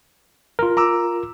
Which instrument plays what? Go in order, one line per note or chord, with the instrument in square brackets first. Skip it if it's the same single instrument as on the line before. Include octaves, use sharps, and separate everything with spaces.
[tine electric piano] F4 A#4
[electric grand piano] A#5 D6 E6